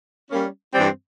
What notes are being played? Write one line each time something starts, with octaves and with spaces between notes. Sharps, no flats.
G3 A#3 C#4
G2 E3 G3 C4